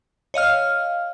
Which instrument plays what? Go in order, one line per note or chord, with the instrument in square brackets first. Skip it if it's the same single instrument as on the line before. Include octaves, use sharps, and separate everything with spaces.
[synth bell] C#5 D#5 F5 F6